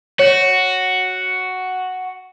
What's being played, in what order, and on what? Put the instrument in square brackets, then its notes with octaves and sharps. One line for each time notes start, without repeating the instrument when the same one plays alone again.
[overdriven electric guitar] F#4 [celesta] C#5